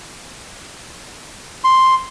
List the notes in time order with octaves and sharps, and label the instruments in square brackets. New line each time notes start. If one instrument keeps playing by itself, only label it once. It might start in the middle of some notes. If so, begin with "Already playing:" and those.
[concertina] C6